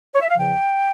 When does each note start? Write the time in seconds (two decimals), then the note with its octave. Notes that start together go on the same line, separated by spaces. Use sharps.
0.14 C#5
0.21 E5
0.29 F5
0.37 E2 C#3 F3 G5